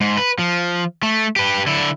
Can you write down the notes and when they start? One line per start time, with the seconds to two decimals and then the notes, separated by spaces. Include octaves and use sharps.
0.01 G#2
0.17 B4
0.39 F3
1.03 A3
1.36 G4 B4
1.67 D3 E4